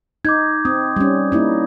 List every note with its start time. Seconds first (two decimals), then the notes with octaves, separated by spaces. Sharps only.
0.25 D#4 D6 G6 G#6
0.65 C4 D#6
0.96 G3 C#4
1.32 A#3 D#4 E4